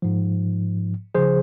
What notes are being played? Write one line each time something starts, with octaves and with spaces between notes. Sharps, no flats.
G#2 F3
C#3 F3 G#4 C5